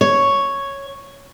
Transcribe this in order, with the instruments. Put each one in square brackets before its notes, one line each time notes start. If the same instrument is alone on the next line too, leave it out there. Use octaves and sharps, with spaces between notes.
[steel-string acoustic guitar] C#5